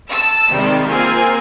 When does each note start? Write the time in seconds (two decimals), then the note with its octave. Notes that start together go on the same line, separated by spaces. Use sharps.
0.11 A5 E6
0.49 C3 D#3 G3 G#3
0.88 A#3 C4 F4 A#4 G#5